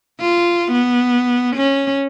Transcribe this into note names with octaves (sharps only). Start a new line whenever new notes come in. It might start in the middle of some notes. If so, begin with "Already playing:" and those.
F4
B3
C#4